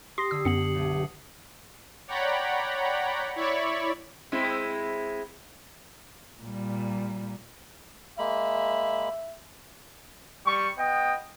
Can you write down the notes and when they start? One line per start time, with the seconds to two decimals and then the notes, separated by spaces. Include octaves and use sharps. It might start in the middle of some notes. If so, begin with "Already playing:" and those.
0.18 G4 C6 D#6 A#6 C7
0.31 D3 E6
0.45 F#2 B3 C#7 F#7
0.75 B1 A3
2.07 C#5 D5 F#5 G5 A#5 B5
3.36 E4 C#5 D5 B5 C#6
4.32 G#3 C4 E4
6.43 A#2 G3
8.19 G#3 A#3 E5 B5
10.46 G3 C#6
10.77 B3 D#5 G5